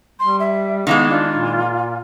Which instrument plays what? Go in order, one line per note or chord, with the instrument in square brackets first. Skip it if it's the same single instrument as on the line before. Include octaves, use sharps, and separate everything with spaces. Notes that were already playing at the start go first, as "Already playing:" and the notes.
[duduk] G3 [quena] C6
[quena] E5
[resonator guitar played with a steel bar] D#3 E3 G#3 [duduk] B3 [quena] F5
[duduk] D4 [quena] F4
[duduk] A#2